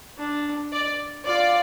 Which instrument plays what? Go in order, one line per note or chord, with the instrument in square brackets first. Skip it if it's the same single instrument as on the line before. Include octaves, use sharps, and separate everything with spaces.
[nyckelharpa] D4
[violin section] D5
[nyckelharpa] F4 [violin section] D5